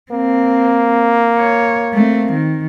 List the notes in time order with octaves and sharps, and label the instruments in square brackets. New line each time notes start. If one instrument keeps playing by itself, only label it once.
[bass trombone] A#3 [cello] C4
[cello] C#5
A3 C4
D#3